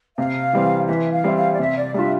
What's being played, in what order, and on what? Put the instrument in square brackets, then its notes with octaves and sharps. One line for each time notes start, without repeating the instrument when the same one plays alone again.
[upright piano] C3 [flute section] F5
[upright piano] E3 G3 C4
[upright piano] E3 [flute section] E5
[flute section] F5
[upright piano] G3 C4 E4
[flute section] F5
D5
[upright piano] C3 [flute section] E5
[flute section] D5
[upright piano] G3 D4 F4 [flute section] E5